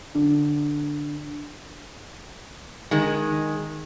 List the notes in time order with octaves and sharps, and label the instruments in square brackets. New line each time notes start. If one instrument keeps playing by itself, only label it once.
[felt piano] D3 D4
[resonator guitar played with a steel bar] D#3 G#3